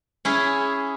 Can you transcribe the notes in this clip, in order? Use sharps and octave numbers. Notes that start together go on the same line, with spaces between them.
C#4 E4 G#4